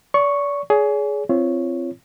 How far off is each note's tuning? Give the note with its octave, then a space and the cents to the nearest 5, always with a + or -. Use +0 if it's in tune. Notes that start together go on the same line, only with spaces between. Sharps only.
D5 -40 C#6 +0
G#4 +15 C#5 +45
C4 +0 F4 -35 C#5 +0